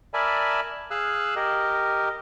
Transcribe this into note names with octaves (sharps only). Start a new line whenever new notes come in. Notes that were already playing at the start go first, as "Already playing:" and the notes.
A#4 D5 E5 G#5 A5 B5
G#4 F5 E6 F#6
G4 A#4 D#5